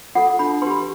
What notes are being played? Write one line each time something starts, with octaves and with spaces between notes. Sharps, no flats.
F4 A4 F#5
D4 B5
G4 B4 B5 C6